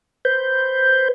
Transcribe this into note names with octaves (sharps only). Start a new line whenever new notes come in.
B4 C5 G6